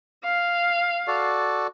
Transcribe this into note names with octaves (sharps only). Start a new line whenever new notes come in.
F5
F#4 A4 D5